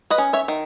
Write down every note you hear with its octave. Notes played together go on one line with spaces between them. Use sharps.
B4 D#5
C#4
C#5 E5
D#3